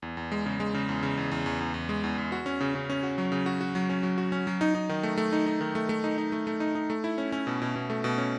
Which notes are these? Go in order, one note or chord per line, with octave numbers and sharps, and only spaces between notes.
E2
E2
G#3
C#3
G#3
C#3
E2
C#3
E2
E2
E2
E2
E2
G#3
E2
E2
F#4
C#4
C#3
C#3
C#4
F#4
F#3
C#3
F#4
F#4
F#3
C#4
F#3
F#4
C#4
F#3
D#4
D#4
D#3
A3
A3
D#4
D#4
D#3
A3
A3
D#4
D#4
A3
A3
D#4
D#4
A3
E4
C#4
C#4
B2
B2
B2
A3
B2
C#4